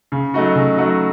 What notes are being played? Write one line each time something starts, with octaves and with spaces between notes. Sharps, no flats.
C#3
F#3 A3 D#4 F#4
C#3
F#3 A3 D#4 F#4